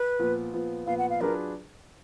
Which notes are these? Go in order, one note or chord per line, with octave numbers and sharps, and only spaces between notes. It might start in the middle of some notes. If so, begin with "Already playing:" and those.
Already playing: B4
A#2 F3 B3
A#2 F3 B3
A#2 F3 B3 F5
F#5
F5
F#3 D4 F4 G#4 A#4 B4